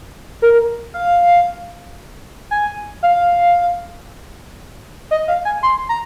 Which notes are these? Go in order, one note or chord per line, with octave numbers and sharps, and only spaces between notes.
A#4
F5
G#5
F5
D#5
F5
G#5
C6
A#5